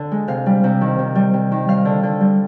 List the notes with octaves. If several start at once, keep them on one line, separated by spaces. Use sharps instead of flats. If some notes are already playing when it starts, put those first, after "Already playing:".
Already playing: D3
G#3
C3 F5
G3
C3
D#3
C3
G3
C3
D#3
G3 F5
D3
D3
G3